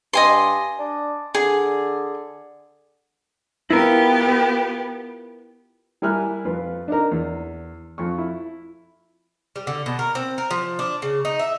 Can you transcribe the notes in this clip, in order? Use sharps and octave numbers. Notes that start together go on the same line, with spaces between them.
G2 D#5 G#5 C6
D4
D3 G#4
B3 E4 F4 G4 A#4
G3 E4 A#4 G#5 F6 F#6
F2 F4 B4
D4 D#4 A#4
E2
F2 C#6
E4
G3
D3
B2
A#4
C4
A#4
F3
D4
C#3
D#4
E5